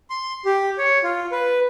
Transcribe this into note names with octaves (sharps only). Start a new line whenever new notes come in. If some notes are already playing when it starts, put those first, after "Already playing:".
C6
G4
C#5
F4
B4